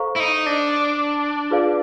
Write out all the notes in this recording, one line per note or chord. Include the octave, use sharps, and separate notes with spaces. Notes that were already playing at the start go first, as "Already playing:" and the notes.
Already playing: A4 C5 F5 A#5 C#6
E4
D#4
D4
F4 G#4 B4 D5 F5